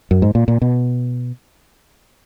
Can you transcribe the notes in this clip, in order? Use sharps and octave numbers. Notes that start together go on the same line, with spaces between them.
F#2
G#2
A#2
A#2
B2